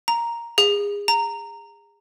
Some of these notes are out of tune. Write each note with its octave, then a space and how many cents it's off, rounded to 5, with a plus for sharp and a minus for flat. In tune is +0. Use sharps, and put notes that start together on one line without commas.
A#5 +5
G#4 -30
A#5 -15